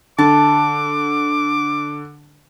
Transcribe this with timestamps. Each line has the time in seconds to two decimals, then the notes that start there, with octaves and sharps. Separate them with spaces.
0.18 D3 A5 D6